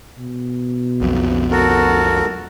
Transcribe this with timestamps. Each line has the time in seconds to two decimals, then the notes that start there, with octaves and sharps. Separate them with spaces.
0.19 B2
1.01 B1 F2
1.51 F#4 A4 A#4